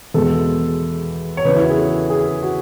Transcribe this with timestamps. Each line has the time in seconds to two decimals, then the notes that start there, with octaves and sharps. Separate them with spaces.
0.14 E2 B2 G#3 A4
1.37 C#5
1.45 E2 C#3 E3 B4
1.55 E4
1.62 F#4
1.70 G#4
1.78 A4
2.10 G#4
2.43 F#4